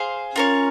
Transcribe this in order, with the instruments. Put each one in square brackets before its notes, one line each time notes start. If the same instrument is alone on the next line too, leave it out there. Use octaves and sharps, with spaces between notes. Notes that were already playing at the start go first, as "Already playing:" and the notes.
Already playing: [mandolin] G#4 C5 F5
[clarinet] C#4 [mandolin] F4 A#4 C#5